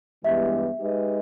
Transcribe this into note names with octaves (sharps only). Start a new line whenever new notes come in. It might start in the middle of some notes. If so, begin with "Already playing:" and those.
G2 E3 G#3 B3 G4 E5
G#3 D#4 G4 B4 D#5